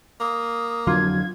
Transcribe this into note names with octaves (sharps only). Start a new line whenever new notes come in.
A#3 D#6
F2 D3 F#3 F4 G#6